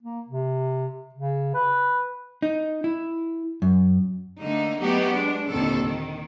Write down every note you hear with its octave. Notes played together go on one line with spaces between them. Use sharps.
A#3
C3
C#3
B4
D#4
E4
F#2
D3 A3 A#3 D#4
F#3 A3 B3 D#4 F#4 G4
G#3 D4
D#2 A#2 D3 D#3 C4 A4
D#3